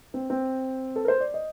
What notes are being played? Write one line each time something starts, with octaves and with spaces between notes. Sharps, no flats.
C4
C4
A4
A#4
C5
D5
D#5